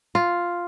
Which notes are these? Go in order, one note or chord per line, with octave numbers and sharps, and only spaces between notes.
F4